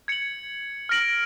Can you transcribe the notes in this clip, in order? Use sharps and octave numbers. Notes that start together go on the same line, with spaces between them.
G#6 C#7 F#7
F6 A#6 D7 F#7